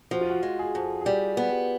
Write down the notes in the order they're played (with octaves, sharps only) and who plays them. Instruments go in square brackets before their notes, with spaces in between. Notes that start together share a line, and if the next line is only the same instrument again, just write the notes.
[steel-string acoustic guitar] F3 [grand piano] F#4
[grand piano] F4
F#4
[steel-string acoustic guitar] G#3
[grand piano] G#4
[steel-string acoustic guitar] F2
[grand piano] G#4
[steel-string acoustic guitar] G3 [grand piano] G4
[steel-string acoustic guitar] B3